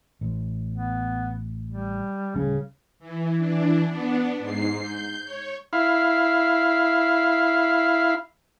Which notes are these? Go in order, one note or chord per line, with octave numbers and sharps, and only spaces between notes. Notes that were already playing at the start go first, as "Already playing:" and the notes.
A1
B3
G3
D1 C#3 G3 C#4
E3
E3 D4
B3 D4
G#2 C7
G6
C#5
E4 F5